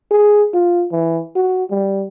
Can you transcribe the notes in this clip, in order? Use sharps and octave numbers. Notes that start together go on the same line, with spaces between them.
G#4
F4
E3
F#4
G3